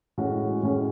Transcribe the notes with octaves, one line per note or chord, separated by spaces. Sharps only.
A2 G#3 C#4 F#4
A2 G#3 C#4 F#4